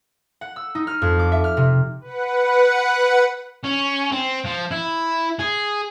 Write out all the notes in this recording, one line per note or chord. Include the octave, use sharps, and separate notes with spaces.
F#5
E6
D#4
F6
F2
D6
E5
F6
C3
B4 F#5
C#4
C4
F3
E4
G#4